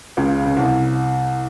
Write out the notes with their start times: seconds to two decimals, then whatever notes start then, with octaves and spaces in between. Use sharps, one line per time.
0.17 C#2 C#3
0.46 C#3
0.56 C2 C3